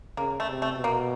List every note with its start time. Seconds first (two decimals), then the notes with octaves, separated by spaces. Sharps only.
0.17 C#3 A#3
0.40 A3
0.48 C3
0.62 A3
0.77 B2
0.84 A#3